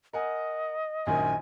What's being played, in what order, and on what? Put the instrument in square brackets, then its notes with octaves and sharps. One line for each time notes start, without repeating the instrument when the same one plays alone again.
[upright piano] A#4 F#5 G#5 [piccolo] D#5
[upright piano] A#1 F#2 D#3 [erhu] G#5